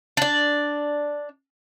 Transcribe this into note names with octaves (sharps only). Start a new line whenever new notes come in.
D4 D5